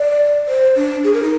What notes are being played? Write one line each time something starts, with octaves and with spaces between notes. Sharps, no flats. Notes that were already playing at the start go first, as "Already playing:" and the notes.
Already playing: D5
C5
D4
G#4
A#4
D#4